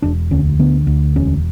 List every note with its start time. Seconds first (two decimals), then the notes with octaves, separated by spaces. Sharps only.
0.02 E1 D4
0.31 D2 C#4
0.59 D3 B3
0.87 D2
1.16 E1 C#4